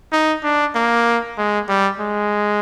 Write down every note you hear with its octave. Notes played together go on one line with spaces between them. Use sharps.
D#4
D4
A#3
G#3
G3
G#3